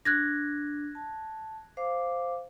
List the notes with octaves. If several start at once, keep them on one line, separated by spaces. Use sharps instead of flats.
D4 F#6 G#6 A#6
A5
C5 F5 D6